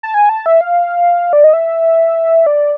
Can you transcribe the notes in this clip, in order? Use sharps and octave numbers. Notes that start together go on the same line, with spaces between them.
A5
G#5
A5
E5
F5
D5
D#5
E5
D5